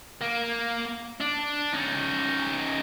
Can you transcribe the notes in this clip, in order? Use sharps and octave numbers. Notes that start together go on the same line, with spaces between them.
A#3
D4
C#4 D#4